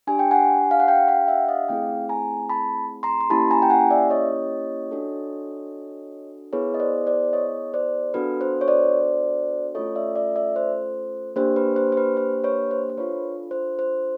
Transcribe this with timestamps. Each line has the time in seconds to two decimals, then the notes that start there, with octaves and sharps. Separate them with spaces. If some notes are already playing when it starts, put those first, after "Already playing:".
0.07 D4 G4 G#5
0.19 G5
0.31 F#5 G#5
0.71 F5
0.80 F#5
0.88 F5 G5
1.08 F5 G5
1.28 E5 F#5
1.48 D#5 F5
1.68 A3 C4 E4 G#4 F5 G5
2.09 G#5 A#5
2.49 A5 B5
3.03 A#5 C6
3.21 C6
3.30 A#3 C#4 E4 G4 A5 B5
3.51 G#5 A#5
3.62 G5
3.70 F#5 G#5
3.91 D5 E5
4.10 C#5 D#5
4.91 D4 F#4 A4
6.53 B3 E4 G#4 B4 C#5
6.74 D#5
6.80 C5 D5
7.07 C5 D5
7.33 C#5 D#5
7.74 C5 D5
8.14 B3 D4 F#4 A4 B4
8.41 C5
8.61 C#5
8.68 C5 D5
9.75 A3 C#4 F4 A4 C#5 D#5
9.95 D5 E5
10.16 D5 E5
10.36 D5 E5
10.56 C5
11.36 A#3 D4 G4 C5
11.56 B4
11.76 C5
11.92 C5
11.97 B4
12.17 C5
12.44 B4 C#5
12.71 C5
12.90 C5
12.98 D4 F4 A4 B4 C#5
13.51 C5
13.79 C5